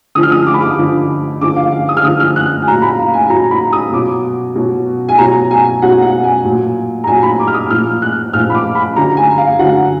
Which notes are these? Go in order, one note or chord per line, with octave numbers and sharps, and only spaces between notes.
D3 F3 D#6
F6
D#6
D6
B5
D6
D3 F3
D3 F3 D6
F5
F5
D#6
F6
D3 F3 D#6
F6
F#6
G#5
A#2 F#3 A#5
B5
F5
G#5
A#2 F#3 A#5
B5
D#6
B2 F#3 D6
B2 F#3
G#5
B2 F#3 A#5
G#5
B2 F#3 F#5
F#5
G#5
A#2 F#3
A#5
A#2 F#3 G#5
B5
D6
F6
D#6
A#2 F3 F6
F#6
A#2 F3 F6
B5
D6
B5
D3 F#3 A#5
G#5
F5
D3 F#3 F#5